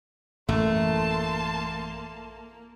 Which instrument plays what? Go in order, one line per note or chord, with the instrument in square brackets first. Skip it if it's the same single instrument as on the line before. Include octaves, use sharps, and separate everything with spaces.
[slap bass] A1 F#2 [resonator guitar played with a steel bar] A3 [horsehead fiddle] A#3 [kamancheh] A5 C6